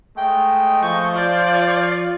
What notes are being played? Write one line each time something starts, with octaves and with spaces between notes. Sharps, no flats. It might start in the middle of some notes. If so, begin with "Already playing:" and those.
G#3 A3 D#5 G5
F3 C#6 G6
F4 D5